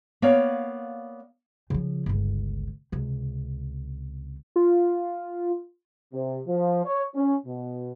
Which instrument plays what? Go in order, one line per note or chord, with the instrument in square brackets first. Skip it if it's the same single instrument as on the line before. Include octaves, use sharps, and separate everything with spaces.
[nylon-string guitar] A#3 B3 C#5 D5 F5
[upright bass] C#3 F3
G1 C#2
C#2 C3
[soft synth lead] F4
[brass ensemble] C3
F3
C#5
C#4
B2